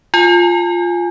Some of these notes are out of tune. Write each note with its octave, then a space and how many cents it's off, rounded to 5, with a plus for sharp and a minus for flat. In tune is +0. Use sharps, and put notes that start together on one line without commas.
F4 +0 G#5 +0